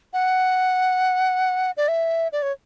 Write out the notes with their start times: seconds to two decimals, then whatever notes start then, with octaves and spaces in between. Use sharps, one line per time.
0.13 F#5
1.77 D5
1.88 E5
2.32 D5
2.42 C#5